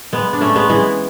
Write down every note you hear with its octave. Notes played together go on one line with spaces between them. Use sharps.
G#3 B3
D4
A3 C#4
G#3 B3
E3 G#3